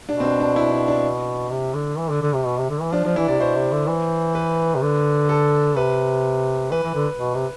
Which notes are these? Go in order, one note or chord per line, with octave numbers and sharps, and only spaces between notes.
B2 D4
C4
D4
D4
E4
D4
D4
C3
D3
E3
D3
D3
C3
B2
C3
D3
E3
F3 D4
F3 D4
E3 E4
C3 D5
B2 C5
C3
D3
E3
B4
C3
D3
A4
C3 B4
E3 B4
E3
D3
B2
C3